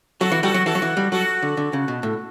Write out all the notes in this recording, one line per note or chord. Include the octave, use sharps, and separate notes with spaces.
F#3 F#4 A4
E3
G3 F#4 A4
F#3
E3 F#4 A4
F#3
E3
G3
F#3 F#4 A4
D3
D3
C#3
B2
A2